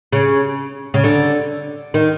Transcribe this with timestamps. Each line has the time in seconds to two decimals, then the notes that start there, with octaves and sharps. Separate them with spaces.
0.13 C#3
0.94 C#3
1.04 D3
1.94 D#3